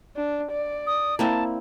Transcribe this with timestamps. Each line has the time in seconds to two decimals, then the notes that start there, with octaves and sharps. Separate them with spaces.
0.16 D4
0.52 D5
0.87 D#6
1.19 A#3 C4 E4 A5